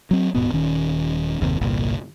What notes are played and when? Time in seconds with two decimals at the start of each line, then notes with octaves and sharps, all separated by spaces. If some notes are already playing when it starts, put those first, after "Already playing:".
0.11 F#3 C4
0.34 D#1 G#2 B2 B3
0.53 D#1 D#3 C#4
1.41 F#1 D#2 C3
1.61 G1 C2 A#2